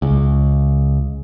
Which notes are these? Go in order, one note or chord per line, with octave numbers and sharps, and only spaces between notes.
C#2